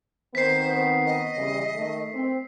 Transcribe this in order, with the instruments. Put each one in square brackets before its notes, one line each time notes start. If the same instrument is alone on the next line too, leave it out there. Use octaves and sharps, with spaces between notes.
[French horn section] D#3 B3 C4 [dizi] C5 [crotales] B6 C7
[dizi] D#5
[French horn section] E2 C#3 G3
D#3 A3
C4